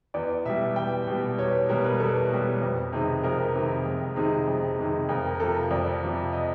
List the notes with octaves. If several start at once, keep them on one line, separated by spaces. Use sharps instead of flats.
E2 D5
B2 G3 E5
E2 G5
B2 G3
E2 C#5
B2 G3 A#4
B4
E2 A4
B2 G3
F2
C3 D#3 G#3
F2 A#4
C3 D#3 G#3
F2
C3 D#3 G#3
F2
C3 D#3 G#3
F2 A#4
A#4
C3 F3 A4
F2 D5
C3 F3
D#5